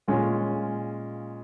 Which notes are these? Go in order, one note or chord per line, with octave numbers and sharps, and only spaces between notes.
A#2 G#3 C#4 F4